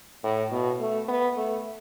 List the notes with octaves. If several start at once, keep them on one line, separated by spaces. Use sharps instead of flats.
A2
B2
A3
B3
A3